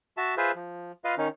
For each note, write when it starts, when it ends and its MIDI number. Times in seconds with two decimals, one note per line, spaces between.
0.17 0.35 66
0.17 0.35 76
0.17 0.35 81
0.37 0.52 65
0.37 0.52 68
0.37 0.52 71
0.37 0.52 72
0.37 0.52 76
0.56 0.92 53
1.04 1.15 65
1.04 1.15 71
1.04 1.15 75
1.04 1.15 77
1.18 1.28 51
1.18 1.28 61
1.18 1.28 63